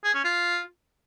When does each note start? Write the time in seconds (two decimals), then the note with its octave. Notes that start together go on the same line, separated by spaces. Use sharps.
0.04 G#4
0.14 C#4
0.24 F4